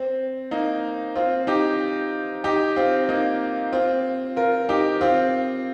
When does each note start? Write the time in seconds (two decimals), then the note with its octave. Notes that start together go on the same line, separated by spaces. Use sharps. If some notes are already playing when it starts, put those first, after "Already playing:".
Already playing: C4
0.51 A#3 D#4
1.16 C4 F4
1.47 D#4 G4
2.44 D#4 G4
2.76 C4 F4
3.09 A#3 D#4
3.73 C4 F4
4.36 F4 A#4
4.69 D#4 G4
5.01 C4 F4